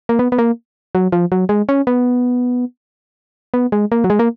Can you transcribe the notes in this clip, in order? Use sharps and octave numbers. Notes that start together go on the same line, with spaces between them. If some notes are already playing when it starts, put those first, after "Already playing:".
A#3
B3
B3
A#3
F#3
F3
F#3
G#3
C#4
B3
B3
G#3
A#3
F#3
G#3
A#3